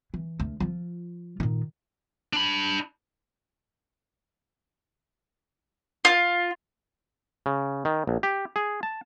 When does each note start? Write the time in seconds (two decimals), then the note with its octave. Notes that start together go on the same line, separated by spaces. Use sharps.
0.14 E3
0.40 D2
0.60 F3 F4
1.40 A#2 D#3
2.33 D4 B5
6.05 F4
7.46 C#3
7.85 D#3
8.07 A#1
8.23 G4
8.56 G#4
8.83 A5